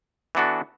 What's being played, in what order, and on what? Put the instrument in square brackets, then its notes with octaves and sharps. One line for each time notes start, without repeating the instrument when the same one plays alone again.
[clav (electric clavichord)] E3 B3 D4 F#4 A4